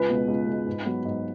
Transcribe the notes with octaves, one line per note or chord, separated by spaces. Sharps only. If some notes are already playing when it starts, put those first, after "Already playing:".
Already playing: C#2 B4
B2 G#3
C#2
B2 G#3
G#2
F#3 B3
G#2